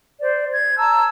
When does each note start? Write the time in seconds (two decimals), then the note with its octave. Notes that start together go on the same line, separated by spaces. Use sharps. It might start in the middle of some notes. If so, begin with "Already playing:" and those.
0.21 C5 D5
0.52 G#6
0.78 A5 A#5 E6